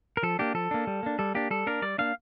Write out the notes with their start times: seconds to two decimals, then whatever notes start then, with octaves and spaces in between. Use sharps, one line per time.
0.17 A#4
0.23 F3 A4
0.39 A#3 D4 G4
0.54 F3 A4
0.71 A#3 D4
0.87 G3
1.03 A#3 D4
1.19 G3 A4
1.35 A#3 D4 G4
1.51 G3 A4
1.66 A#3 D4 A#4
1.82 G3 D5
1.98 A#3 D4 F5